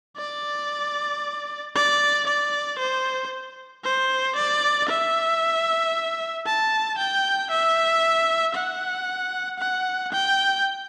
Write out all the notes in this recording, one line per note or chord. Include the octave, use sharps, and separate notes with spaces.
D5
D5
D5
C5
C5
D5
E5
A5
G5
E5
F#5
F#5
G5